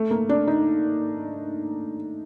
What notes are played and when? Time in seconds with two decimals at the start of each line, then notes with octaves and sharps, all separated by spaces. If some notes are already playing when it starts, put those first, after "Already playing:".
Already playing: A3
0.11 A#3
0.29 D4
0.47 D#4